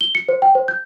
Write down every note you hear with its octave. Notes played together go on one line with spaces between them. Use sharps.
G7
C#7
C5
G5
C5
G6